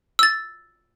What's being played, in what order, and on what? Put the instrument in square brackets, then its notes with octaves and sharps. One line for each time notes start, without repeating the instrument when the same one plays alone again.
[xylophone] E6 A6